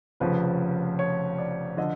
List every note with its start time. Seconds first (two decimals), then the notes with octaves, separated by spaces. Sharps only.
0.20 F1 F2 C#3 F3 B4
0.99 C#5
1.38 D5
1.77 D3 F3 D#5